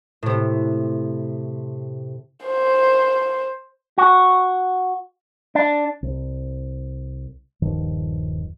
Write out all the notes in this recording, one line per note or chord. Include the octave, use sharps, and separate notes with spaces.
A2 C3
C5
F#4
D4
C2
D#1 G2 D#3 F3